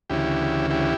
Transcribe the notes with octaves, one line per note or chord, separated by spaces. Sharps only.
D2 C#3 E3 E4 G4
E4 G4